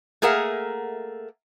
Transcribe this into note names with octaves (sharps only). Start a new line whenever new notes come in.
A3 A#3 G#4 A#4 E5 F#5